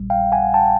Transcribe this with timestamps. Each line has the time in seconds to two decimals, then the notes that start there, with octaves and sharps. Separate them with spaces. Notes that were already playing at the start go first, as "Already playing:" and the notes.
Already playing: A#1 A#2 G3
0.10 F5 G5
0.32 F#5 G#5
0.54 G5 A5